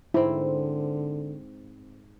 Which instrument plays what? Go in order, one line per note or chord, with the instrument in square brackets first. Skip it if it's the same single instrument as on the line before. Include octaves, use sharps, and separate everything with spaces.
[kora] G#2 C4 [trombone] D3 [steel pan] E4